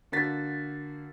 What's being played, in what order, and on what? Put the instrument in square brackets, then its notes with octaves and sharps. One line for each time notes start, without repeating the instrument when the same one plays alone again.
[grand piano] D3 A#3 F#4 A6 B6